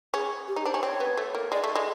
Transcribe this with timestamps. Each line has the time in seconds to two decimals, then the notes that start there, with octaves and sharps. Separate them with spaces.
0.14 C#4 G#4
0.48 G4
0.56 D#4
0.65 D4 C5
0.74 C#4
0.83 C4 C#5
1.00 B3
1.17 A3
1.35 A#3
1.52 G#3 D5
1.64 A3
1.75 G#3